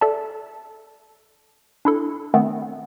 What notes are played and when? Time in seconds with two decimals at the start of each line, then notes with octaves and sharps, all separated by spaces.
0.01 A4 D5 E5 A5
1.85 D4 E4 A4
2.34 D#3 A3 B3 C4